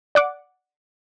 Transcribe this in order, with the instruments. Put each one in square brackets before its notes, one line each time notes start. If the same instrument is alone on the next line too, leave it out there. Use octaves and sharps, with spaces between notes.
[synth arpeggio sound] D5 F#5 D6